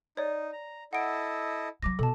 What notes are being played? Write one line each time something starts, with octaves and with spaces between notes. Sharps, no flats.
D#4 C#5 D5
A#5
E4 A4 D#5 F#5 D7
F3 F#3 D6 A#6
B2 A4 A5